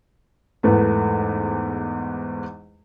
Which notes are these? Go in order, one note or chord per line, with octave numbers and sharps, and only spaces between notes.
E2 G#2 E3 A3 B3